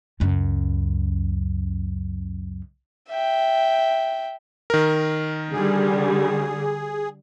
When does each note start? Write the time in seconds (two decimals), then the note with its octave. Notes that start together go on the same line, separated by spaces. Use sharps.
0.20 C#2 F#2
3.09 E5 G5
4.70 D#3 A#4
5.52 D3 G3 G#4